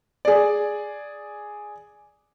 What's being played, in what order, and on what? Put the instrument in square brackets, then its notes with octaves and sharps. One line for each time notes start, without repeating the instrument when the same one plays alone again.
[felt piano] G#4 D5